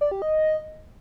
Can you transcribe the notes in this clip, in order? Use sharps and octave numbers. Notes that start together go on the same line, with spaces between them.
D5
G4
D#5